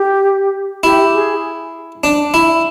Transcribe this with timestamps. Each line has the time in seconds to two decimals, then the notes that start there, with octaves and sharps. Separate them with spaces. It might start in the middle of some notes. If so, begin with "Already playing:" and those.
Already playing: G4
0.83 E4 G4
1.13 G#4
2.04 D4
2.34 E4